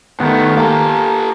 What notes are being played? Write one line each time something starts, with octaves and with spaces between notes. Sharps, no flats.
G2 D#3 A3 B3
A#3 G4 A4